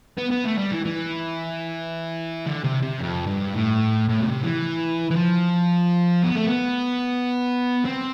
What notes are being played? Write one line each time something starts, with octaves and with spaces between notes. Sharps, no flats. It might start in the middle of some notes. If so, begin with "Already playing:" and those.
B3
B3
A3
G3
E3
E3
D3
C3
C3
F2
G2
A2
A2
B2
C3
E3
E3
F3
B3
A3
B3
C4